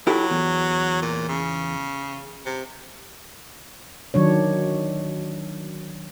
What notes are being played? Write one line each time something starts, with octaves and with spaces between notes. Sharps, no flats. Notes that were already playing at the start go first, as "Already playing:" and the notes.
F#3 E4 G4 A4
E2
A#2
C#3
C3
D#3 F#3 D4 C#5